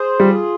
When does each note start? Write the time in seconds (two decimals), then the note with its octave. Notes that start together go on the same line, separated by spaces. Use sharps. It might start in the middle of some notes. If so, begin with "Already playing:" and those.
Already playing: G#4 C5
0.20 G3 F4